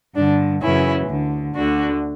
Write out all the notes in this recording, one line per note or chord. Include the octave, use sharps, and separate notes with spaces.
G2 D3 D4
F#2 C#3 E3 C#4 E4
D2 D3
D2 D3 D4 F#4